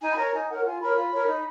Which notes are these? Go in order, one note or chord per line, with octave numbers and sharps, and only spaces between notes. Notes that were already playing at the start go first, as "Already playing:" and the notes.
D#4 G#5
B5
A#4 C#5 A#5
D#4 G#5
A#4 C#5 F#5
F4 G#5
A#4 C#5 B5
F4
A#4 C#5
D#4